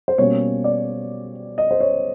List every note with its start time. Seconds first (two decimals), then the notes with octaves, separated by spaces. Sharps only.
0.08 C5
0.18 B2 G3 A#3 C#4 C#5
0.64 D5
1.58 D#5
1.71 C5
1.80 C#5